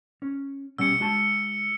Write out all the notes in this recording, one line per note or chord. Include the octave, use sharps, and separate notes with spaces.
C#4
B2 G3 C#4 E6 C#7
G#3 F#4 A5